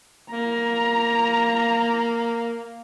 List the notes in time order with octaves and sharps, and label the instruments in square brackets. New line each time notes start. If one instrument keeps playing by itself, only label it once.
[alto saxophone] A#3 [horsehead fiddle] A#5